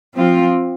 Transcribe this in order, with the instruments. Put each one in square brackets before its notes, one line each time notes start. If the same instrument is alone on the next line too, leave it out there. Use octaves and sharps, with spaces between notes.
[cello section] F3 C4 F4